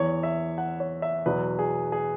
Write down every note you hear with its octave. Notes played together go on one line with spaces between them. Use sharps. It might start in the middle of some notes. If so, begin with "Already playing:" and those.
Already playing: E2 E3 C#5
E5
F#5
C#5
E5
E2 B2 F#3 B4
G#4
G#4